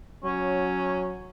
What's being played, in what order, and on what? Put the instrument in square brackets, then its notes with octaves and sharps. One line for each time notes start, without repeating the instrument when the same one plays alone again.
[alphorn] F#3 [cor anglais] C#4